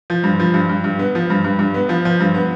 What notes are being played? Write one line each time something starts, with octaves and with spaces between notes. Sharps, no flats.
F3
G2
F3
G2
G2
G2
B3
F3
G2
G2
G2
B3
F3
F3
G2
B3